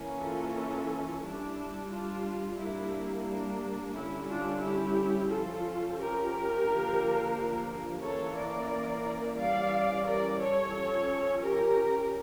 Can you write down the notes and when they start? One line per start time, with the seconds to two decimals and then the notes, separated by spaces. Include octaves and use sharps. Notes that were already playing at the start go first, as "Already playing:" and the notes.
Already playing: E3 A#3 C#4
0.19 F4 A4
1.22 G3 D4 E4
1.90 D4 F4
2.57 G3 A#3 D4 E4
3.26 D4
3.94 D3 G3 C#4 E4
4.27 D4 F4
4.61 E4 G4
5.30 F3 C#4 F4 A4
5.97 G4 A#4
6.65 D3 F3 A#3 D4
8.01 E3 A#3 C#4 A4 C#5
8.36 A#4 D5
9.37 E3 G3 C#4 D5 F5
10.05 A#4 D5
10.39 A4 C#5
10.74 F3 C#4
11.41 G4 A#4